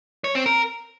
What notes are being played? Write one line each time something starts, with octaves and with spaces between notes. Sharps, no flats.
C#5
C4
A#4